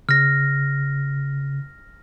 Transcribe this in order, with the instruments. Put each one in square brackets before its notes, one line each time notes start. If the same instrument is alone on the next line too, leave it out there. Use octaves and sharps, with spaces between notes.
[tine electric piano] C#3 [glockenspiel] F6 A#6